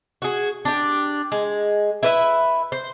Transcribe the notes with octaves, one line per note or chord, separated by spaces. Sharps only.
F#4 G#4
D4 G4
G#3
E4 B4 E5
C5